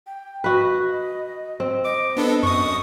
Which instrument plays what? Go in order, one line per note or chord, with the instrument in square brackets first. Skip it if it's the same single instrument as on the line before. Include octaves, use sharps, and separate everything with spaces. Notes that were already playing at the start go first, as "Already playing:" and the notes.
[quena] G5
[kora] F#4 B4 [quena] D#5
[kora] C4
[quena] D#5 [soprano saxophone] D6
[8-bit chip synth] B3 D4 A4 [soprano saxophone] B4
[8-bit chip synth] F#2 D#6 [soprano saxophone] C#6